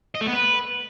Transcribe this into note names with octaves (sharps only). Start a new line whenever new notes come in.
D#5
A3
B3
B4